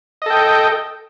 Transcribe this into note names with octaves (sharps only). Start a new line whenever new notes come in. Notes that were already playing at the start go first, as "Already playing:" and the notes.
A4 D#5 G5